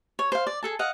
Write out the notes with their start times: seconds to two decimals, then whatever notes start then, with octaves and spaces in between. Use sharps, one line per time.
0.19 C#5
0.32 C5 F5
0.47 D5
0.63 G#4 A4 A5
0.79 D#5 F5 F#5